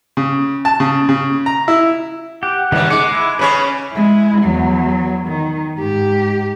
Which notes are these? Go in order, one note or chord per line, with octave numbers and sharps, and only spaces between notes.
C#3
A5
C#3
C#3
A#5
E4
G4 F#5
D#2 C#3 E3 G3 G#3
G#3 F#5 D6
E4
C#3 C#4 G#4 B4 C#5 B5
G#3 E4
E2 F#3
D#3
G#2 G4